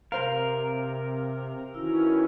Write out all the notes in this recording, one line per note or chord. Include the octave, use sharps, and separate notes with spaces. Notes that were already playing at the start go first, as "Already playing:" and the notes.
C3 A#4 C5 F5
D#3 E3 C#4 E4 F#4 E6